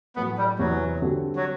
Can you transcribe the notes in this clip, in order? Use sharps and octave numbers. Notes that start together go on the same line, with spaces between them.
A2 F#3 A3 B3
G3
E2 C3 E3 F#3 B3
D3 G3 C4 F#4 A4
F#3